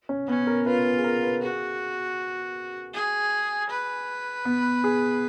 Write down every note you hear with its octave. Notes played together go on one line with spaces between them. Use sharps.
C#4
B3 C#4
A#4
F4 B4
B4
G#4
A#4
B4
F#4 G#4
G#4
B4
B3
G#4